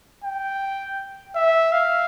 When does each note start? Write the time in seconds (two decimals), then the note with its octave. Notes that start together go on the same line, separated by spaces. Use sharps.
0.24 G5
1.35 E5
1.72 F5